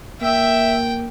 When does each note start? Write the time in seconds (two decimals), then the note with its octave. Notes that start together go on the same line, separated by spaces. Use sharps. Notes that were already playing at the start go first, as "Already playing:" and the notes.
0.22 A#3 E5 G5